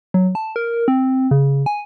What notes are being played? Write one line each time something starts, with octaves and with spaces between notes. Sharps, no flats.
F#3
A5
A#4
C4
C#3
G#5